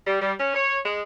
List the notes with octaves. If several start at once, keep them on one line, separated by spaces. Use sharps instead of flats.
G3
G3
C#4
C#5
G#3